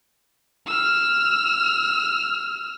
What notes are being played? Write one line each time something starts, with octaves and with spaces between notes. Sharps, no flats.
E6 F6